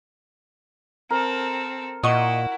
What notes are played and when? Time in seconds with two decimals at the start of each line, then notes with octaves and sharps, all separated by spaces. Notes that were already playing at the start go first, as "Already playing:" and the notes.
1.10 C4 A4 A#4
2.03 A#2 E4 F#4 D#5 C#6